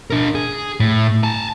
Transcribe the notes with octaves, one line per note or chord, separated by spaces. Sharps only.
D4 A#4
G#4
A2
G#5 A5